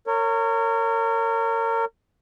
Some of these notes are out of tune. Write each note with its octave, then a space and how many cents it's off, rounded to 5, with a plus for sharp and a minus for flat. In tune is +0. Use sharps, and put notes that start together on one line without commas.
A#4 -30 C#5 +0